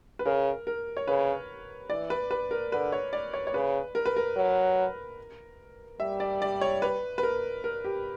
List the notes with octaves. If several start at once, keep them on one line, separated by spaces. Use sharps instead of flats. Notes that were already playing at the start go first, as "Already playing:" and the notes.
B4
C#3 A#4
A#4
C#5
C#3 B4
E3 D5
B4
B4
A#4
D3 B4
C#5
D5
C#5
C#5
C#3 B4
A#4
B4
A#4
F#3
G3 E5
D5
D5
C#5
B4
B4
A#4
A#4
G4